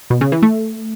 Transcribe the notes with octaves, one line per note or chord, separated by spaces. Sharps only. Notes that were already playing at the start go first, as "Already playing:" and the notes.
B2
C#3
E3
A3